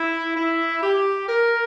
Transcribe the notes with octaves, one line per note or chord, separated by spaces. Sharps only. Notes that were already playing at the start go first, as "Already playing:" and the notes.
Already playing: E4
E4
G4
A#4